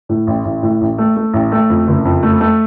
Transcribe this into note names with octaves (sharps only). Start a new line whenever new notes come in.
A2
A1
A1
A2
A1
A3
A3
A1
A3
F2
F#1
F2
A3
A3